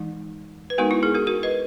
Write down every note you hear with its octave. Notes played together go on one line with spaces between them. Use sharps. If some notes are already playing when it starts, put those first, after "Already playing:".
Already playing: E3 G#3 D#4
B4
G#3 B3 D#4 F#4 A#4
E4
E4 G#4
F#4 A#4
F#4 A#4
B4 D#5